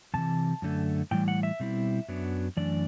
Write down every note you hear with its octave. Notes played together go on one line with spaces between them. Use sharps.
E2 C3 E3 A5
F#2 D3 A3
A2 E3 G3 G5
F#5
E5
B2 G3 C4 E4
F#2 F#3 B3 D4
F#2 E3 A3 D4 D5